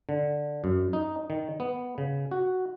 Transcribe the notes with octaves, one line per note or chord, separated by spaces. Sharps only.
D3
F#2
D#4
D#3
B3
C#3
F#4